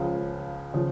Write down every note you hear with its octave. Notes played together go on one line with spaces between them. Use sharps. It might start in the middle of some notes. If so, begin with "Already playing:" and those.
Already playing: C#2 C#3 F3
C#3 F3